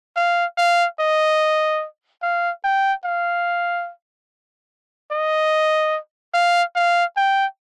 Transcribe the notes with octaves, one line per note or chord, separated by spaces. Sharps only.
F5
F5
D#5
F5
G5
F5
D#5
F5
F5
G5